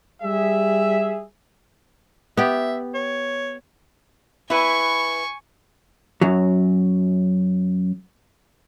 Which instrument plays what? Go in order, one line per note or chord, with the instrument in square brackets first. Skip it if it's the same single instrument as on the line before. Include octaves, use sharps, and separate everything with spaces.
[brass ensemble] G3 G#4 E5
[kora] B3 G4 [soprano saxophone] E5
[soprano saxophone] C#5
[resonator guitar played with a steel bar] E4 B4 [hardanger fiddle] G#5 C#6
[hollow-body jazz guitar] F#2 F#3